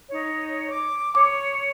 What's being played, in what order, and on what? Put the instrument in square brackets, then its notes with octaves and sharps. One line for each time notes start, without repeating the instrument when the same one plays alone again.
[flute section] D#4 C#5
D6
[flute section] C#5 [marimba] D6